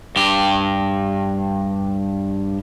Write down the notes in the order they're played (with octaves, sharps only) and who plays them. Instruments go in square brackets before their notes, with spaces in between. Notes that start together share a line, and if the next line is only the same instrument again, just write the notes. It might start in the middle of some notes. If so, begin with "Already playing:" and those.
[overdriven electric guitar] G2 G4